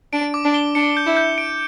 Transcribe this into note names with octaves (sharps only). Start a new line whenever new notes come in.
D4 D7
D6
D4
G7
D4 C#7
G6
E4
G6
D7